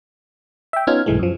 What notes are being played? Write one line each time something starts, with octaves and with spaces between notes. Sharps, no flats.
E5 G5
B3 C#4 D#4 F4 F6 G#6
B1 G2 E3 G#3 A3
F#2 F3